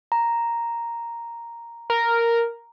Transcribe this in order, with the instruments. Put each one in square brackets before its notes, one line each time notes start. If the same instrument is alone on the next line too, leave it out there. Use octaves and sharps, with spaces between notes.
[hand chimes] A#5
[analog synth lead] A#4